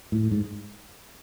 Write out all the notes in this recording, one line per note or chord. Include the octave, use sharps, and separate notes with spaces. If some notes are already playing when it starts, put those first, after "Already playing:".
A2
G#2